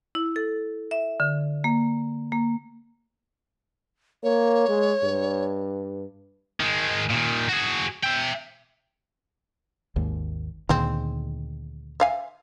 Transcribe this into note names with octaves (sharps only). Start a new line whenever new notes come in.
E4
A4
E5
D3
A#3
A#3
A#3 C#5
G#3
G2
D#3 G#3
A#2 D#3
F#4 G#4
E5 G5
G#1 D#2
D2 A#2 D#3 G#3 C4
E5 F5 G#5